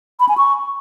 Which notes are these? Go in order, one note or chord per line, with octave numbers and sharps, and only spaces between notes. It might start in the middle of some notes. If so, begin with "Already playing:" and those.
B5
G#5
C#6